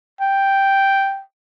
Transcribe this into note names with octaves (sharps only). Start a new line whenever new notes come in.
G5